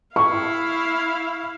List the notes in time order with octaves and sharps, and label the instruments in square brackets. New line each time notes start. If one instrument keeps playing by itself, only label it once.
[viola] E4 F5 [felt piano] C#6